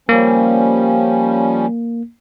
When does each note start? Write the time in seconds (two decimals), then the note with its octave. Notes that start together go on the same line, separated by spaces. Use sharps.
0.09 F3 G3 A#3 C#4